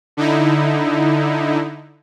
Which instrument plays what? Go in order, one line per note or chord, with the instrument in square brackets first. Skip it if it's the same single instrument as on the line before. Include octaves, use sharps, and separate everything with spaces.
[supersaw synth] D3 D#4 E4